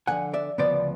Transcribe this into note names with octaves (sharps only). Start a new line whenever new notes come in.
D2 D3 F3 F#5 G#5
D5 E5
D2 C#3 F3 B3 C5 D5